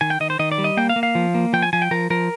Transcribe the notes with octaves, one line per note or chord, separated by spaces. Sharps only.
D#3 G#5
G5
D#3 D#5
C5
D#3 D#5
D5
G3
D#5
A#3 G5
F5
A#3
F5
F3
A#3
F3 G5
G#5
F3 G#5
G5
F3 A#4
F3 A#4